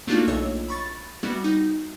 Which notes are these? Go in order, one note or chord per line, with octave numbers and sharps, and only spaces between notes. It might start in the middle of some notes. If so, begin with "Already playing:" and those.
A3 A#3 D4 D#4 F4 F#4
B1 C#5 D#5 E6
B5 C#6 A6
G3 B3 E4 F#4
D#4